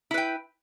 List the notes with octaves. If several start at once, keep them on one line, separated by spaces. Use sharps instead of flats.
E4 B4 G5